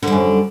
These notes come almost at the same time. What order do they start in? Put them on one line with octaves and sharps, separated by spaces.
D3 G3 F#2